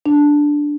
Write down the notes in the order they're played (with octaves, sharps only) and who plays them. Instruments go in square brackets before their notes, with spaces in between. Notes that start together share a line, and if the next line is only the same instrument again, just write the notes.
[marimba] D4